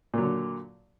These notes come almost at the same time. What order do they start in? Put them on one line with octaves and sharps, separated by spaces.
A#2 F#3 D3